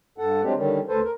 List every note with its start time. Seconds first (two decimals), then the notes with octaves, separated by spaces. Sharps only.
0.18 G2 A4 F#5
0.43 F#3 G#3 C4 D4 G4
0.56 D3 D#3 G3 C#4
0.88 D2 A4 B4 C5
1.04 A#4